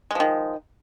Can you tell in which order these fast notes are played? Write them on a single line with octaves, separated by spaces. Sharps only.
G#3 F3 D#3